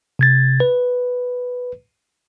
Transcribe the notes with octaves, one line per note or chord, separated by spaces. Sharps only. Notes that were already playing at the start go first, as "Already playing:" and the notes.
C3 G#6 A6
B4